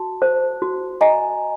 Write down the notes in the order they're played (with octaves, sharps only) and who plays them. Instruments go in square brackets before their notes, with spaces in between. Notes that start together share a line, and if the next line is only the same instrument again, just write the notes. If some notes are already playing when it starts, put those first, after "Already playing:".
Already playing: [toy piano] F#4 [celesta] A5
[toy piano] C5
F#4
[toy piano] D#5 [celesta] G#5 A#5